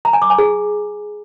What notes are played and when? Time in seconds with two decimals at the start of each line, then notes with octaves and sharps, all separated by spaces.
0.05 A#5
0.13 G#5
0.22 D6
0.30 G#5
0.38 G#4